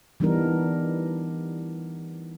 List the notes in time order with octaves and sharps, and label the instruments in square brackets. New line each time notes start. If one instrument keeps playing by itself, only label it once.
[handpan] E3 G3 B3 D4 D#4 A#4